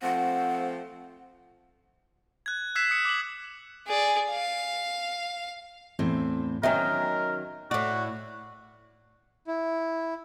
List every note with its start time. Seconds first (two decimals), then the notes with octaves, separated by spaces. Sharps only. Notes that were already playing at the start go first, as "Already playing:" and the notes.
0.03 F3 A3 C4 F#5
2.46 F#6 G#6
2.75 E6 F#6 G#6 B6 C7 E7
2.91 D#6 C#7
3.05 D6 F#7
3.87 G#4 D5
4.31 F5
5.99 E2 A2 C4
6.63 D#3 F#3 C#4 A#4 E5 G5
7.71 A2 F#4 D5
9.47 E4